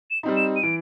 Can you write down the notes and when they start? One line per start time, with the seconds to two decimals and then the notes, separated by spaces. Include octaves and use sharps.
0.11 E7
0.23 G3 C4 D#4
0.37 E7
0.56 D#7
0.63 E3 D7